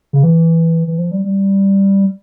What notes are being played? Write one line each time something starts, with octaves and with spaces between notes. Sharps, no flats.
C#3
E3
E3
F3
G3
G3